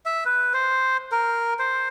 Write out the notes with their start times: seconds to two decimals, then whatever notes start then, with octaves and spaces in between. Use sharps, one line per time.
0.06 E5
0.25 B4
0.54 C5
1.12 A#4
1.59 C5